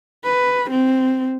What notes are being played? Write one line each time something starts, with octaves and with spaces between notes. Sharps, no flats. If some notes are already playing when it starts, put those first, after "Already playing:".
B4
C4